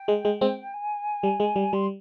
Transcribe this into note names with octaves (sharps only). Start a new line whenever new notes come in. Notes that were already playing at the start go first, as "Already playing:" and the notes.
Already playing: G5
G#3
G#3
G#3 C4
G#5
G3
G#3
G3
G3 C6